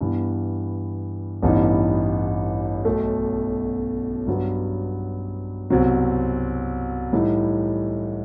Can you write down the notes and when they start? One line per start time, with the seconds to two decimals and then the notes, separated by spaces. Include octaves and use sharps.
0.01 G2 E3 B3
1.43 A1 G2 E3 B3 D#4
2.85 B1 B2 A3
4.27 G2 F#3 B3
5.70 C2 B2 F#3 C4
7.12 A2 E3 G3 D#4